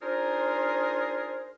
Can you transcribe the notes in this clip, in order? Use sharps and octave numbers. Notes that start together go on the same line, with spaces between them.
D4 D#4 F4 G#4 A#4 C5